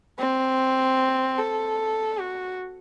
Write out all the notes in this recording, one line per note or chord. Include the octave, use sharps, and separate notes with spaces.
C4
A4
F#4